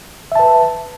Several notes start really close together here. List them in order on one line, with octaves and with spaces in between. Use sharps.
E5 A5 B4